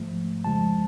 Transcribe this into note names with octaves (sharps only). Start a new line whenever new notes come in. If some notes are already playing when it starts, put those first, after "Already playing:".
Already playing: G#2 F3 A3
F2 C#3 F3 G#3 A5